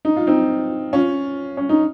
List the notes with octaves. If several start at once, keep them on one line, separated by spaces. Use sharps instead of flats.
D#4
F4
C4 D#4
C#4 F4
C#4
D#4